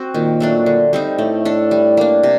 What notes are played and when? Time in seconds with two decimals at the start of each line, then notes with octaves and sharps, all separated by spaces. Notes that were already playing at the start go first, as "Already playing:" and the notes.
Already playing: C4 F#4
0.14 A#2 D#3
0.40 F#3 A3 D4
0.66 D3
0.93 G3 C4 D#4
1.18 A2 A3
1.45 D4 A4
1.71 G3
1.97 A#3 D4
2.23 C3